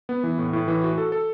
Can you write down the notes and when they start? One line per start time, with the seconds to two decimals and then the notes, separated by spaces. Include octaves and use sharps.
0.09 B3
0.24 E3
0.38 A2
0.53 A2
0.68 E3
0.83 F#4
0.98 A4
1.12 A4